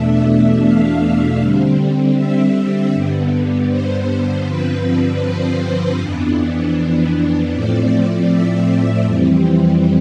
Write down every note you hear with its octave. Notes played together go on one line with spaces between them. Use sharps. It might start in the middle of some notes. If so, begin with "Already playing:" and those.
Already playing: E2 B2 A3 D4 E5
F5
D3 G3 C4
E5
G2 D3 G3 B3
C5
G2 D3 F3 C4 B4
C5
F2 E3 B3 D4
A2 F3 A3 C4 D5
E5
F2 E3 G3 C4